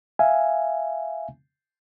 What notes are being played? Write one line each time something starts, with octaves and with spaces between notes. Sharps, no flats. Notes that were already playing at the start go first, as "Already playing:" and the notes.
E5 F5 G#5